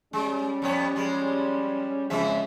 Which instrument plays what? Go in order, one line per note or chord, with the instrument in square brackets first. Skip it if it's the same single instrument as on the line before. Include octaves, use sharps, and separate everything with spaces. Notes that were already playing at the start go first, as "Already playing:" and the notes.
[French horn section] G3 C#4 [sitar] G#3
[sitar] F2 B3 C#5
F3 G#3
[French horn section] F2 G#3 [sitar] C#3 F3 E5